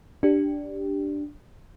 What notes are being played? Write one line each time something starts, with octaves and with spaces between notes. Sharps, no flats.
D4 G4